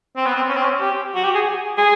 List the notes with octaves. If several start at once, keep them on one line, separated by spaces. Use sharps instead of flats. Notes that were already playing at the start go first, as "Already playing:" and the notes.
C4
B3
C4
C#4
C4
C#4
G4
F#4
G4
G#4
G#4